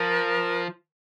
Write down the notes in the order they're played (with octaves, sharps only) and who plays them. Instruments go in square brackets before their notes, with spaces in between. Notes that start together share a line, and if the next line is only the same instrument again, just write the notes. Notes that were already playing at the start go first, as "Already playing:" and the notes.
Already playing: [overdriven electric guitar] F3 [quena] A#4